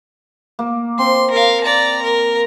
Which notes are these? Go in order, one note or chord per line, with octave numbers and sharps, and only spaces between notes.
A#3
C4 C6
A#4 F5
D5 A#5
A#4